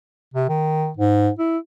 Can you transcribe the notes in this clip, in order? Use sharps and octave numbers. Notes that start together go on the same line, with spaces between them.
C3
D#3
G#2
E4